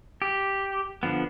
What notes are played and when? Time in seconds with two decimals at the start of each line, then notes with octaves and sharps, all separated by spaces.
0.22 G4
1.03 D3 F3 B3